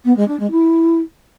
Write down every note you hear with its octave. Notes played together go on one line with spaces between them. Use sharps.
B3
G#3
D4
G#3
E4